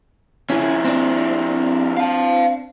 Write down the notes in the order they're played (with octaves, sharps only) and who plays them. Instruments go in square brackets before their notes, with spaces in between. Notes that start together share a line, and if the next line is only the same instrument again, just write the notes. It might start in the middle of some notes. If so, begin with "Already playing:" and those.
[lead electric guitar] F2 E4 [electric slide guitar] C#4 G#4
[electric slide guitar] C4 D4
[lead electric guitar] F5 A5